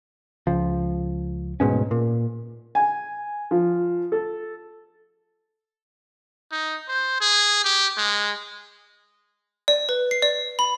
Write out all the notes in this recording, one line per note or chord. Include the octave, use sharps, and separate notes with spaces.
C#2 F3
D1 G#2 B2 C#4
A#2
G#5
F3
A4
D#4
C5
G#4
G4
G#3
D5
B4
C7
D5
B5